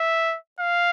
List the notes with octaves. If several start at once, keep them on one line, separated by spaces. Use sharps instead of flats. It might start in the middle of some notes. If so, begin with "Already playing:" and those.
Already playing: E5
F5